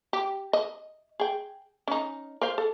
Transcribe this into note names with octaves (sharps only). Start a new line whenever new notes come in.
G4
D#5
G#4 G5
C#4 D#4
A#4 C5 F5
A4